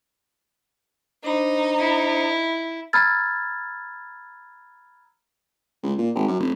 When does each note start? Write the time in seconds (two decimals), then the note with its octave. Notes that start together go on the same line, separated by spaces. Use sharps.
1.24 D4 D#4 C5 B5
1.79 E4
2.93 A#5 B5 E6 F6 G#6 A6
5.83 C#2
5.98 A#2
6.15 G#1
6.28 F#2
6.40 F1